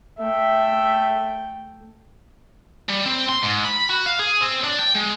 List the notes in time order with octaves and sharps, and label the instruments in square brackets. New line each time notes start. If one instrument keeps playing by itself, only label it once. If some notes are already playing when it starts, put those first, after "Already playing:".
[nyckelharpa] A3 G5 [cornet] E5
[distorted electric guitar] G3
C4
C6
G#2
B5
F#4
F5
G#4
C4
D4
G5
G#3